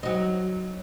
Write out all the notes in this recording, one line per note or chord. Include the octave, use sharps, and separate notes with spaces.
F#3 D#4